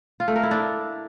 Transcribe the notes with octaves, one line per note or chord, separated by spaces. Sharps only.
F4
A3
A#4
E4
D4